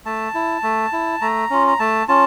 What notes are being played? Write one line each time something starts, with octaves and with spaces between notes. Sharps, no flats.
A3 A5
E4
A3
E4
A3 A#5
C#4 F4
A#5
A3 A5
C#4 F4 A5